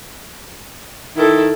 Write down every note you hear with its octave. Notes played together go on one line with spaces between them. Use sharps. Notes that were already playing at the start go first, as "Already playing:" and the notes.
D#3 E4 A4